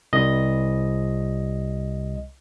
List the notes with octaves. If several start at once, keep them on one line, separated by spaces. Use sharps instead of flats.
C2 D#5